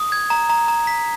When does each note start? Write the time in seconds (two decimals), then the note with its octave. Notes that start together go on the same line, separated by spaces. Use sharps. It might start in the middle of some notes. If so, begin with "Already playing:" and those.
Already playing: D#6
0.12 G#6
0.30 A#5
0.49 A#5
0.68 A#5
0.87 B6